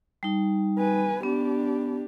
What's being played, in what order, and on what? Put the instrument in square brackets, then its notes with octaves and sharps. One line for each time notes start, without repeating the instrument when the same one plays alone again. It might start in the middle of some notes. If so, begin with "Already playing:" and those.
[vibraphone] G3 D#4
[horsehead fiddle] B4 G#5
[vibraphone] B3 [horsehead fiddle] D4 G4